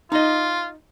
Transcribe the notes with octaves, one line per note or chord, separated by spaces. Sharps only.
D#4 F4 D#5